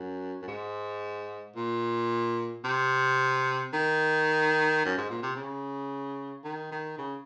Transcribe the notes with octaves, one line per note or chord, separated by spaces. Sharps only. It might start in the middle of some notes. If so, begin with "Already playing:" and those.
Already playing: F#2
F#2
G#2
A#2
C3
D#3
F#2
G#2
A#2
C3
C#3
D#3
D#3
C#3